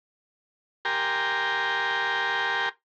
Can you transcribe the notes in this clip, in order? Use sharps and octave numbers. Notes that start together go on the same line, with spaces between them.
G4 A#4 G5 G#5 A#5 C6